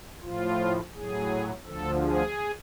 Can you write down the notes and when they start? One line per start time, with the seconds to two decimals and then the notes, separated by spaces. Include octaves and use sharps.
0.23 A2 F3 F4
0.94 A2 F#3 G#4
1.66 D2 D3 F3 A4
2.01 G#4